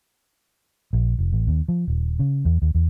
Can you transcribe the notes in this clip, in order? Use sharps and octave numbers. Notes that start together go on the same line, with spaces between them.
A#1
F1
A1
D#2
F3
D#1
C#3
E2
D#2
E2